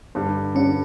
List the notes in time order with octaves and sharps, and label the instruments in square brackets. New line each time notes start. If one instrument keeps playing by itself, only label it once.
[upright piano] G2 D3 G3
[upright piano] G2 D3 G3 [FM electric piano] C#4